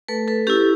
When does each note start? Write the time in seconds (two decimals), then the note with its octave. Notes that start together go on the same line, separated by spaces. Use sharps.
0.08 A3 A4 B4
0.28 A4 B4
0.47 C#4 E4 G4 A4